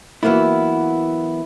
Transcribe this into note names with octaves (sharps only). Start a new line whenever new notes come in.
E3 F#3 A#3 B3 E4